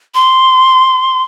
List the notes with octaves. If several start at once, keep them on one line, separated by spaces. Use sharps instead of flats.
C6